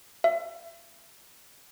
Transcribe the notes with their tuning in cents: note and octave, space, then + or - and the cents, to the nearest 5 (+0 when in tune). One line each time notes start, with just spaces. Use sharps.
E5 +30